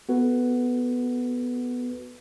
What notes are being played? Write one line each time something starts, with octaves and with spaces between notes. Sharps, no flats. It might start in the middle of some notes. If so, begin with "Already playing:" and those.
B3 F#4 A4 B4